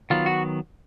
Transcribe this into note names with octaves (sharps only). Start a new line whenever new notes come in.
D#3 F#3 B3 F4
F#4